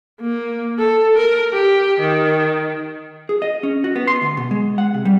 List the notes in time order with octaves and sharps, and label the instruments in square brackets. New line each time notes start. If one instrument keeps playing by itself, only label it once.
[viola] A#3
A4
A#4
G4
D#3
[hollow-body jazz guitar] G#4
D#5
C#4
F#4
B3
C6
D2
B2
G#3
F#5
C3
G3